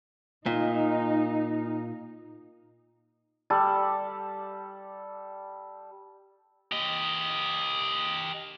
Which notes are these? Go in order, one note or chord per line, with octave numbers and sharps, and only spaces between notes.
A#2 D#4
G3 A4 D5
G4 D#5